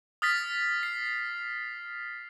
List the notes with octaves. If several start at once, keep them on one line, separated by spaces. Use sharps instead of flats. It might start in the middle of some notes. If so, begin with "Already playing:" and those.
D#6 F6 A6 B6
C7